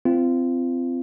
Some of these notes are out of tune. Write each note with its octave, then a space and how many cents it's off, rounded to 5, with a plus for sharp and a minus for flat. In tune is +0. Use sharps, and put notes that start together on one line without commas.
C4 -20 F4 -25